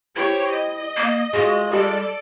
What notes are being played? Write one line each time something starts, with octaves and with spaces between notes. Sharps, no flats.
E4 G4 C5 C#5
D#5 D#7
A#3
G#3 F4 F#4
G3 G4 A4 D5 D#5